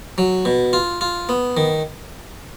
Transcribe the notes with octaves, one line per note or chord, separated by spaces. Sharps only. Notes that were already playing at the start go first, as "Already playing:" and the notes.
F#3
B2
F4
F4
B3
D#3